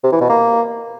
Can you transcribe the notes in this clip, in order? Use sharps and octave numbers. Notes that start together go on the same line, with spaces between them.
C3
E3
B2
A#3